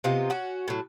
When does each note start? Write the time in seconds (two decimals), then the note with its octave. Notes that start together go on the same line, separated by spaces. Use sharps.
0.04 C3 B3 F4 D#5
0.30 C#4 F#4
0.68 A2 F#3